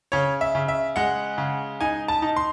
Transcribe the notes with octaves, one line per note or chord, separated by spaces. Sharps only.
C#3 C#5
E5
C#3
E5
G#3 F#5
C#3
D#4 G#5
A5
D#4
C6